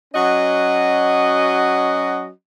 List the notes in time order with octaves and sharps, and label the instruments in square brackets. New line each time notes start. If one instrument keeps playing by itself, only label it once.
[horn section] F#3 C#4 F#4 D#5